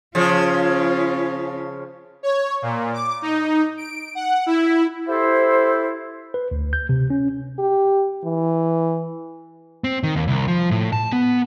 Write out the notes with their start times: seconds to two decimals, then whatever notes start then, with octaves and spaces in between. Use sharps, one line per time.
0.15 C#3 F3 C#4 F4
2.23 C#5
2.62 A#2
2.93 D6
3.22 D#4
3.77 D7
4.15 F#5
4.46 E4
5.09 E4 G4 A4 C5
6.34 B4
6.51 D2
6.73 G6
6.89 C3
7.10 C#4
7.59 G4
8.24 E3
9.84 C4
10.03 D#3
10.16 D#2
10.28 C2
10.48 F3
10.71 A2
10.93 A5
11.13 B3